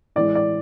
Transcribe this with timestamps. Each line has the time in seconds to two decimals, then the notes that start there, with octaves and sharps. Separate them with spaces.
0.16 A2 E3 G#3 D5
0.35 D5